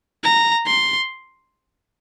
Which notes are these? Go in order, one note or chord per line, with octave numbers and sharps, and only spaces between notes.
A#5
C6